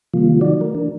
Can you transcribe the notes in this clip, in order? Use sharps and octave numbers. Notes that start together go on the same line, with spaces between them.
C3 D#3 F3 G3 A#3 F4
D#3 F#3 D#4 F#4 D5
A3 A#4
E3 D4